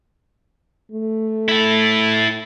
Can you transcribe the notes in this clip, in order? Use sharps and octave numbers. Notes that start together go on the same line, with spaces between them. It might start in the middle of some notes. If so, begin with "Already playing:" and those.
A3
E4 A4